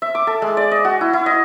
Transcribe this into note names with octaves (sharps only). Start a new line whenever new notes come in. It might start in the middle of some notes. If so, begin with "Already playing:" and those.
E5
D6
A4
G#3
D5
D#5
F#4
E4
E4
D#5